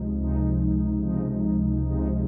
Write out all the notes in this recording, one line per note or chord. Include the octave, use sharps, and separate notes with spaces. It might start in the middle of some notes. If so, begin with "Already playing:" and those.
Already playing: C#2 C3 F3 G#3 D#4
C#2 C3 F3 G#3 D#4
C#2 C3 F3 G#3 D#4
C#2 C3 F3 G#3 D#4